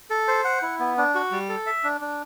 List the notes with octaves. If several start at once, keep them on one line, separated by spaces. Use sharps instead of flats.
A4
C5
F#5
E4
B3
D4
F#4
G3
A4
E5
D4
D4